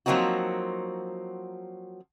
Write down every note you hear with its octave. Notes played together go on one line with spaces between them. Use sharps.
F3 F#3 A#3 C4 D#4 F#4